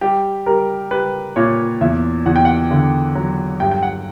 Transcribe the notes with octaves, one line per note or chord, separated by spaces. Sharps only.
G3 G4
G3 A#4
G3 B4
A#2 C#5
E2 E5
E2 F#5
G5
F#5
D3
F#3
G2 G5
G5
F#5